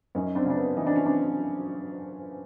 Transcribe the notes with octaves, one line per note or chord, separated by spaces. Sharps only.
F#2 C#4 D#4
C4 D4
C#3 D4
B3 C#4
E3 D#4
D4
C#4
C4 D4